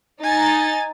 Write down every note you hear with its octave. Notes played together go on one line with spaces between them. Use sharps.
D#4 G#5 A6